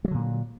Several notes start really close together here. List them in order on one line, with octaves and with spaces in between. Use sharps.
G3 F#3 D3 A#2